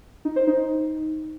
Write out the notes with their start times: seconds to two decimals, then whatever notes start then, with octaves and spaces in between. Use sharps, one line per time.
0.25 D#4
0.36 C5
0.47 D#4